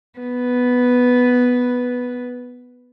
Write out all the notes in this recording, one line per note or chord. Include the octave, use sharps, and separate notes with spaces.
B3 B4